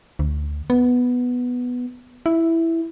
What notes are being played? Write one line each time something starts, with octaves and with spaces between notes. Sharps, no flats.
D2
B3
E4